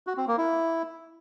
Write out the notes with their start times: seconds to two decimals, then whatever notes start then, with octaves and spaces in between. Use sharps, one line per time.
0.07 F#4
0.17 C4
0.28 A#3
0.38 E4